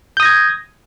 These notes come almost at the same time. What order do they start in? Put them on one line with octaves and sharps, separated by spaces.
G6 D#6 A#6 G#6